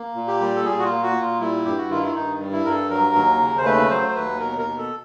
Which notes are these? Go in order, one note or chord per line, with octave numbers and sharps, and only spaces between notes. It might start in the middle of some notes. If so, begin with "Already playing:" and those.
Already playing: A#3
A#2
G4
G3
A4
A#2 G#4
F#4
F4
A#3
F#4
A#2
F4
G3 E4
G2 G4
F#4
D#3 F4
E4
G2 D#4
G3
E4
G2 A#4
A4
F#3 A#4
D#2
C#3
C5
A3 B4
F#3 C5
C5
D#2 B4
B2 A#4
A#4
B2
A4